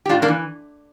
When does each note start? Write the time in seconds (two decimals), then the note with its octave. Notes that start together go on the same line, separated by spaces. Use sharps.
0.06 G4
0.09 A2 D4 F4
0.22 A#3 D4
0.28 E3